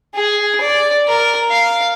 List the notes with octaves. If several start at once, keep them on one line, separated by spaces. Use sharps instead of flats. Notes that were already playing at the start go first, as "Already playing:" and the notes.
G#4
D5
A#4
F5